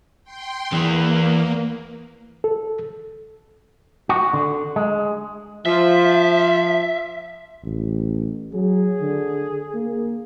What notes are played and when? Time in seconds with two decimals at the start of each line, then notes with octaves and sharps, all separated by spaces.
0.24 G5 C6
0.73 E2 E3 A#3
2.44 A4
4.09 F#4
4.33 D3
4.76 G#3
5.66 F3 E5
7.63 A1
8.53 F#3 G#4
9.01 D3
9.74 A#3